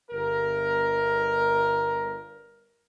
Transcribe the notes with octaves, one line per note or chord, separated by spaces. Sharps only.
G1 A#4